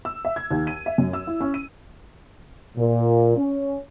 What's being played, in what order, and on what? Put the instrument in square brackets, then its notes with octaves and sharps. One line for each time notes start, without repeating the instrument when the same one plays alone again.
[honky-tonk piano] E6
E5
G#6
D#2
D#7
E5
F#2
E6
E4
C#4
D#7
[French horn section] A#2
C#4